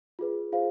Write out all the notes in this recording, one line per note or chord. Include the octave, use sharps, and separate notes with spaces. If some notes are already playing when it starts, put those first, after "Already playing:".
F4 G#4 B4
F4 G#4 C5 F5